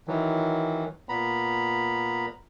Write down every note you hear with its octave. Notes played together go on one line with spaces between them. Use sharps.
D#3 E3 F#3
A#2 B3 A#5 B5